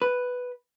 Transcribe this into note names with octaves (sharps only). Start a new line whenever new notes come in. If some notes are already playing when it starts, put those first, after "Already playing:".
B4